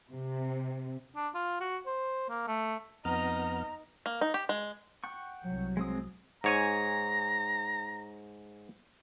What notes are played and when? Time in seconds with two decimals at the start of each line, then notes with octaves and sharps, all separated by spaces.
0.10 C3
1.16 D4
1.35 F4
1.61 F#4
1.86 C5
2.29 A#3
2.47 A3
3.05 F2 B3 D#4 D#5 A#5 F6
4.06 A#3
4.21 D#4
4.34 G4
4.49 G#3
5.04 F#5 G5 C#6
5.45 C2 F#3
5.77 G#3 C4 D#6
6.44 G#2 C#5 G#5 A#5